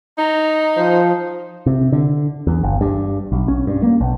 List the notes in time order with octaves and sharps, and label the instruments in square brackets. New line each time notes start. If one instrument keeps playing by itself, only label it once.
[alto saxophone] D#4 [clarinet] A#5
[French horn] F3 [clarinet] C5
[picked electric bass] C3
D3
E2
G1
G2
B1
C#4
G2
A#3
B1